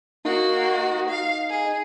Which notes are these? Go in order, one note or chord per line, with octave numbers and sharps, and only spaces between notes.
A#3 D#4 F#4
F5
G#4